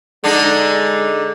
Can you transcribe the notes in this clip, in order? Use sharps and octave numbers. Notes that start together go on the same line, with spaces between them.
D3 G#3 D4 D#4